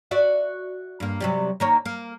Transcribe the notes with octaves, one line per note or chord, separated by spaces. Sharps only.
F#4 D5 E5
G2 A#3
C3 F#3 G3
D#3 A#3 C#5
A#3